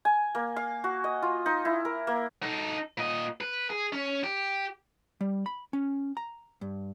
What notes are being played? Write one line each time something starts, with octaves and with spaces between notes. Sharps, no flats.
G#5
A#3
F5
F#4
D#5
F4
D#4
E4
A#4
A#3
D#4 A4
A#2 D#5
B4
G#4
C#4
G4
G3
B5
C#4
A#5
G2